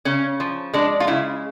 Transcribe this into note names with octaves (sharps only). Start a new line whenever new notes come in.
C#3 C#4
F3
G#3 D4
F4
C#3 E4